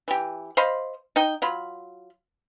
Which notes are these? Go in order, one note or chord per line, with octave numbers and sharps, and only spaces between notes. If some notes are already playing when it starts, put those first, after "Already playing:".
E3 G4
C5 D#5 F5 B5
D#4 D#5 G5
F#3 F4 B5